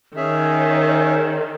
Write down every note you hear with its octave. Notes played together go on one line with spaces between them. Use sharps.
D#3 C#4 G#4 C#5 E5